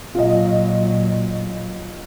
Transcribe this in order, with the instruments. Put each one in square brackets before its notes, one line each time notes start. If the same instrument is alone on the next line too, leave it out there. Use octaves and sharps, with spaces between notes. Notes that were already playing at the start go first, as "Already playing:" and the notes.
[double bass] A#2 F#3 [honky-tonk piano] F4 D#5